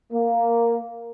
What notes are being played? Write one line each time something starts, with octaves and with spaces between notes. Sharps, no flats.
A#3